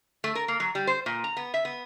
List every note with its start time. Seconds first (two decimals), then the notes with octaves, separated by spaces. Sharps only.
0.24 A3
0.35 A#4
0.48 A#3
0.60 F#3
0.75 G3
0.87 C5
1.06 A#2
1.24 A#5
1.37 B3
1.54 E5
1.65 B3